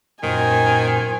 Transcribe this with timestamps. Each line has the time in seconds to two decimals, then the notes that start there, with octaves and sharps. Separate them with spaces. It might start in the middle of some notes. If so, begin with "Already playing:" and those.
0.23 F#2 A#2 D#3 C5 G#5